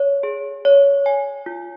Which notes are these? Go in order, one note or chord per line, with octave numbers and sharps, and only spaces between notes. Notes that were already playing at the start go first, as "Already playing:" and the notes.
Already playing: C#5
G#4
C#5
G#5
F4